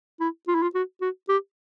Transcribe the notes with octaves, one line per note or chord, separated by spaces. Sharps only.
E4
F4
E4
F4
F#4
F#4
G4